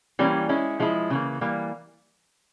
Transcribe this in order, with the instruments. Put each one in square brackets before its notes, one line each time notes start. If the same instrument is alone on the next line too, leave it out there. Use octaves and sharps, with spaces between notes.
[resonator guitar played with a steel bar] E3 G3 A#3 C#4
G#3 C#4 E4
F3 G#3 E4
C#3 E3 A#3
E3 G3 A#3